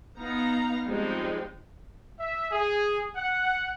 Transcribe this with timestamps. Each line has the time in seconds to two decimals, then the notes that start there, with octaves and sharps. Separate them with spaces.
0.18 B3 D#4 F5 A#5
0.85 F3 G3 G#3 C4 D#4
2.20 E5
2.52 G#4
3.16 F#5